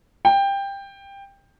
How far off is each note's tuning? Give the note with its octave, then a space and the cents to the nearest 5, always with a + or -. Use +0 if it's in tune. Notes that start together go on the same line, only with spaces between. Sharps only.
G5 +15